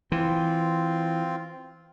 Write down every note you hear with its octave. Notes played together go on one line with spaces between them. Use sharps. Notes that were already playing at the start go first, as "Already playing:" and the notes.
E3 C4 F4